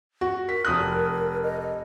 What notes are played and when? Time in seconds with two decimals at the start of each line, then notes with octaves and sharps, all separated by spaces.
0.21 F#4
0.49 A#4 B6
0.65 F1 D#6 F#6
1.43 D#5
1.60 D#5